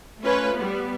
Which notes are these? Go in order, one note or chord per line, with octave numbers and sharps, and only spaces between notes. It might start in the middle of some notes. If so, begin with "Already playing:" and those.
A3 C#4 F4 B4 C#5
G3 B3